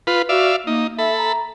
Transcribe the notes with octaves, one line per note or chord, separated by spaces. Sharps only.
F4 B4
F#4 D5 E5 F5
A#3 D#4
A4 E5 B5
A#5